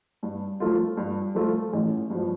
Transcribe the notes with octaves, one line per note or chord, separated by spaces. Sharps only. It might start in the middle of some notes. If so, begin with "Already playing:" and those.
G2
F3 A3 F4
G2
F3 A3 F4
A1
G2 F3